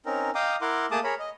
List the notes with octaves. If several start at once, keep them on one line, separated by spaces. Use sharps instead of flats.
C4 C#4 D#4 A#4
D#5 F5 G5 A#5 D6 D#6
E4 A#4 F#5 C6 D6
A3 A#3 G#4 A5 D6 D#6
G#4 A#4 C#5 B5
D#5